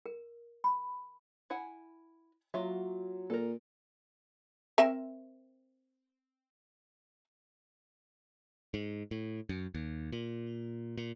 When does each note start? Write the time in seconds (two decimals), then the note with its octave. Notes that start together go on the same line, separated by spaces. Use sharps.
0.06 A#4
0.64 B5
1.50 E4 F#5 G#5
2.54 F#3 A#3 F4 E5
3.30 A#2 A4 A#4
4.78 C4 A#4 E5
8.74 G#2
9.11 A2
9.49 F#2
9.74 D#2
10.12 A#2
10.97 A#2